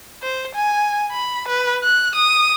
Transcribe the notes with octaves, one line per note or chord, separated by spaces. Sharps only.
C5
G#5
B5
B4
F#6
D#6